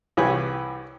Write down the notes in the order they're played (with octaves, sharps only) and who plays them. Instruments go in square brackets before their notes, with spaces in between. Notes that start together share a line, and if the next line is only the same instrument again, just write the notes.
[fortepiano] C2 E3 G4 G#4 B4 C#5